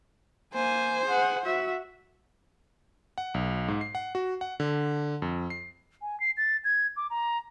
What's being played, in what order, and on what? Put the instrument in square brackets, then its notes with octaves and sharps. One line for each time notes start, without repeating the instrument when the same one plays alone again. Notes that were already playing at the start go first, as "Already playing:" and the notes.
[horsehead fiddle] A#3 G#5 [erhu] C5
[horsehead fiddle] G#4 F#5
F#4 E5
[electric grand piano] F#5
B1
G#2
C7
F#5
F#4
F#5
D3
F2
C7
[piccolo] G#5
C7
A6
G#6
D6
A#5